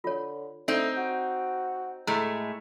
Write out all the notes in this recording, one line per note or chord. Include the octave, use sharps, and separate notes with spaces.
D3 F4 C#5
A3 C4 D#4 D5
F#4
A2 G#3 A3 A#5